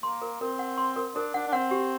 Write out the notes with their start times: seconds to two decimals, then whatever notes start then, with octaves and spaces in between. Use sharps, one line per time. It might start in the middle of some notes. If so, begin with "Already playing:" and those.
0.03 A#3 C6
0.22 A#4
0.41 C4 A#4
0.59 F#5
0.77 C6
0.96 A#4
1.15 D4 A#4
1.34 D4 F#5
1.48 D4
1.53 C4 F#5
1.71 G4